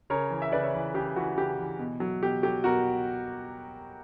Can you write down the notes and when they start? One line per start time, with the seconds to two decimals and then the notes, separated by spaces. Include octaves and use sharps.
0.10 C#3 A#4 C#5
0.30 E3
0.42 E5
0.52 C#3 B4 D5
0.63 C#5 E5
0.74 E3
0.94 C#3 G4
1.16 E3 F#4
1.37 C#3 G4
1.58 E3
1.79 B2
2.00 F#3
2.22 B2 G4
2.43 F#3 G4
2.64 B2 F#4 A#4